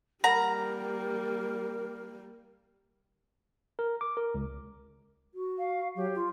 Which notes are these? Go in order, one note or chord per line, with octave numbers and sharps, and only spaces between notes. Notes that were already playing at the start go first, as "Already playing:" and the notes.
G3 A#3 A#4 F#5 A#5
A#4
D6
A#4
C#2
F#4
F5
F#3 G4
F4